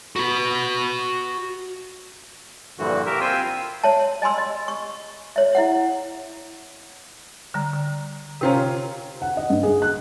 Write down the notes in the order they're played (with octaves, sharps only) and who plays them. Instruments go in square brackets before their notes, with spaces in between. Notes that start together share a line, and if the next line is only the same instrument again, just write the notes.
[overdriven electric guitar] F#4 B5
[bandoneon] G2 A#2 D3 E3 F3 F#4
G4 A#4 E5
C4 F4 C5 G5 G#5 E6
[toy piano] C#5 E5 A5
D#5 G#5 B5 C6 E6
D#5
C#6
C#5 E5
E4 E5 F#5
[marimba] D3 G3 A#5
D3
[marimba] C3 C5 A#5 [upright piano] C#4 F4 G4
[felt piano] F#5
D#5
G2
G#4
F#6